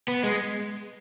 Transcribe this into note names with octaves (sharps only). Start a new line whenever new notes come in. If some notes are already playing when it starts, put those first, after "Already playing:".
B3
G#3